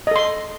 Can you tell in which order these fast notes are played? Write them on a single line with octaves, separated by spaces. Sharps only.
D#5 A4 C6